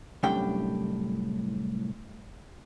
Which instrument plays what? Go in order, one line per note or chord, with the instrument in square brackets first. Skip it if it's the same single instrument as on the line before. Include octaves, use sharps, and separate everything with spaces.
[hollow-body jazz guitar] C2 F#2 A2 D4 G4 G5